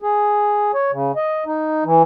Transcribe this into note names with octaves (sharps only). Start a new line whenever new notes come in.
G#4
C#5
C#3
D#5
D#4
E3